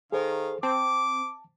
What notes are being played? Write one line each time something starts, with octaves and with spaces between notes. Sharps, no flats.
D#3 G#4 A4 C5 F5
C4 A5 D6